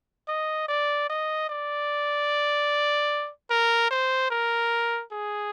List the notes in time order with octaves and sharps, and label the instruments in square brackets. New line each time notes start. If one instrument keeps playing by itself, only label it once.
[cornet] D#5
D5
D#5
D5
A#4
C5
A#4
G#4